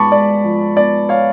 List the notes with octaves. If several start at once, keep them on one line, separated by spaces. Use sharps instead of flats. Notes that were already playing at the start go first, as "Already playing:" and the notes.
Already playing: G#2 B3 A5 B5 C#6 D6
G#2 D5
F3
B3 D5
C#5 F5